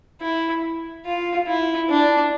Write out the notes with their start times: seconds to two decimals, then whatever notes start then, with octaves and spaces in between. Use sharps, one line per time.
0.21 E4
1.05 F4
1.47 E4
1.89 D4